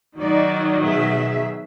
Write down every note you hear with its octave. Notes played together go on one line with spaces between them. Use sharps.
D#3 F#3 D#4 D5
B2 G#4 E5